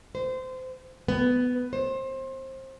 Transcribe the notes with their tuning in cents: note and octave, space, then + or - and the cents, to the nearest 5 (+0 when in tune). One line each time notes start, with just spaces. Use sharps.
C5 -25
B3 +10
C5 +25